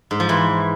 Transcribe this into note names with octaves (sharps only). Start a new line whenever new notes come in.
G#2
F3
E3